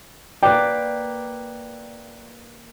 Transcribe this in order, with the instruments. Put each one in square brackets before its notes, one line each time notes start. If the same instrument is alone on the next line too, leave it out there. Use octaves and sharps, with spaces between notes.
[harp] A#3 B4 D5 [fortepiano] G5